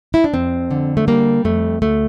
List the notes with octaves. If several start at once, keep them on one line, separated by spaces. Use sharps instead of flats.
E4
D4
F2 C4
D3
A3
G3 A#3
F2 A3
D2 A3